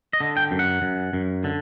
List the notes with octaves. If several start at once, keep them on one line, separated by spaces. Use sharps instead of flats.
D#5
D3
G5
F#2
F#5
F#2
F#2
D3